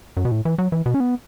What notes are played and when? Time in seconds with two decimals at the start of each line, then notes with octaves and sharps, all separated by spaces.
0.17 F#2
0.25 B2
0.31 A2
0.45 E3
0.58 F#3
0.72 E3
0.86 B2
0.94 C#4
1.00 B3